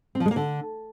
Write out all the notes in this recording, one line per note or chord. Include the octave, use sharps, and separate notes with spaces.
C4
F3
G#3
A#3
D3